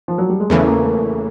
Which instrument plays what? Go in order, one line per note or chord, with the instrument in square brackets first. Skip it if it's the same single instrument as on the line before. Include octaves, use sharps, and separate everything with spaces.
[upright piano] F3
F#3
G3
G#3
[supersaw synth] E2 C#3 E3 [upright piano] A3
[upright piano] A#3
A3